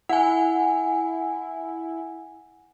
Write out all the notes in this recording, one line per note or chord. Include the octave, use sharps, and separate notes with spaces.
E4 F#5 G#5